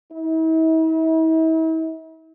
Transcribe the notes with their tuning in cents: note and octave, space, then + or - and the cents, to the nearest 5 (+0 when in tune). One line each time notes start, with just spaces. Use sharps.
E4 -45